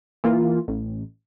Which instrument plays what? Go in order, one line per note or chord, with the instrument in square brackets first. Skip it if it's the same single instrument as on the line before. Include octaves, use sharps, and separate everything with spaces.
[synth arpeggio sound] E3 A#3 F4
A1